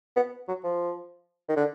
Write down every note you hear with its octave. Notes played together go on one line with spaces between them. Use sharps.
B3
F#3
F3
D#3
D3